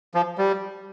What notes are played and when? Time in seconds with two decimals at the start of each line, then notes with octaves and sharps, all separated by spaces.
0.14 F3
0.38 G3